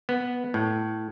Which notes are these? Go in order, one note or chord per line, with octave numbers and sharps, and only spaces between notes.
B3
A2